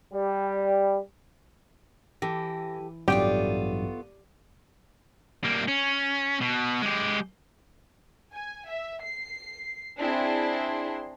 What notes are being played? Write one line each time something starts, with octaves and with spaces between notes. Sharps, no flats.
G3
E3 G4 A4 A#6
A1 G2 F#3 A3 B3 F4 G4 D5
G3 A#3
C#4
B2
G#3 G4
G#5
E5
C7
C4 D4 E4 G#4 C6